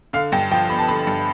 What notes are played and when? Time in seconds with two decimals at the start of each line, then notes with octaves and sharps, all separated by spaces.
0.13 D3 F5
0.32 G2 G5
0.51 F3 G5
0.70 B3 B5
0.79 A5
0.88 D3 B5
1.07 G2